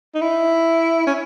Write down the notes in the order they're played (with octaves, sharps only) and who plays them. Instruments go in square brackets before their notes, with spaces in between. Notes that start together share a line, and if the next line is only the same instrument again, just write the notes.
[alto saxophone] D#4
E4
C#4